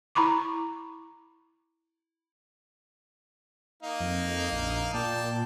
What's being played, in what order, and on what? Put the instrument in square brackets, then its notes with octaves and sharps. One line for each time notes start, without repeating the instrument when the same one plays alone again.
[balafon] E4 A#5 B5 C#6 D6
[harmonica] A#3 D#4 F5
[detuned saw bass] F2
A#1
[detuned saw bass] A#2 [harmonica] D5 G5 A5